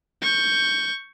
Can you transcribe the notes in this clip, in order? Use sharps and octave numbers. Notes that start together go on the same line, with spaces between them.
C#6 G6